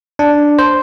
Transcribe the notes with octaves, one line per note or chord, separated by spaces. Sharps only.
D4
C5